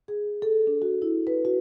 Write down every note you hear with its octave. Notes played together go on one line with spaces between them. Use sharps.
G#4
A4
D4
F#4
E4
B4
F#4